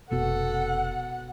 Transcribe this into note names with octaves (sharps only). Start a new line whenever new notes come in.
F1 B2 B3 F#4 A4 F#5